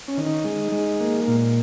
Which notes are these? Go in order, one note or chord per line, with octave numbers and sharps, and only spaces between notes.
C#4
D#3
D#4
G#3
G#3
A#3
A#2